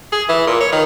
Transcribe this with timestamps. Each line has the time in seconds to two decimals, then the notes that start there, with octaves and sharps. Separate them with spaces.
0.12 G#4
0.29 E3
0.47 A#2
0.60 C#5
0.72 D#3